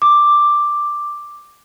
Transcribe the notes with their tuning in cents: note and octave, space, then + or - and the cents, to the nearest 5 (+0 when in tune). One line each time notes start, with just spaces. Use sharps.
D6 +5